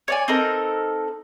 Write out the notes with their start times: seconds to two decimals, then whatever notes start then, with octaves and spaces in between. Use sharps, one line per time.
0.08 C#5 D5 G#5
0.28 C4 D#4 A4 A#4